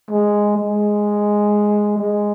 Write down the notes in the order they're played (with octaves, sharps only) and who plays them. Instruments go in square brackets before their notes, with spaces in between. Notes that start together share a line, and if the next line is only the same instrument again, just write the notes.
[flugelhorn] G#3
G#3
G#3